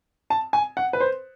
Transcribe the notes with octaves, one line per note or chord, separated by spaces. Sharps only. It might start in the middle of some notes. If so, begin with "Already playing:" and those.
A5
G#5
F#5
B4
C5